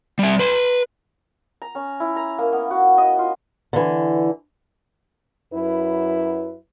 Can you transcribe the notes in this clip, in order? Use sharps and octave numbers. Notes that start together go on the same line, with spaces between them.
G3 E5
B4 C6
A#5
C#4
E4
A#5
A#3
B3
F#4
D#5
F4
D3 E3
F#2 F#3 E4 B4